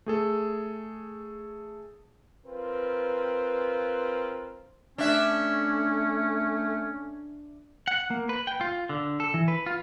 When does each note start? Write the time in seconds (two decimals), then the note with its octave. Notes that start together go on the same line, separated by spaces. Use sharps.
0.06 A3 G#4 A4
2.46 C4 F4 A#4 B4
4.98 A3 C#4 D4 E5
7.88 F#5
8.11 A#3
8.29 B4
8.47 G5
8.61 F4
8.89 D3
9.20 A4
9.34 E3
9.48 B4
9.66 F4